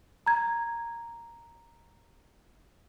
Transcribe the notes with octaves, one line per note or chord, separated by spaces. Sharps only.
A#5 G#6